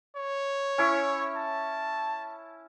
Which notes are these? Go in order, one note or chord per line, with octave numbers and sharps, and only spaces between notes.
C#5
C#4 E4 C#6
A5